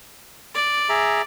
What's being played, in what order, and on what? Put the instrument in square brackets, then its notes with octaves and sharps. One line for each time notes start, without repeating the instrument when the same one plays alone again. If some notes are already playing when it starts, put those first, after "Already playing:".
[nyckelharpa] D5
[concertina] G#4 E5 A#5